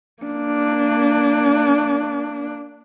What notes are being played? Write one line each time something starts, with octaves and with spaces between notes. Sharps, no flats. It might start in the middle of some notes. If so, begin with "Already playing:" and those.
A#3 D4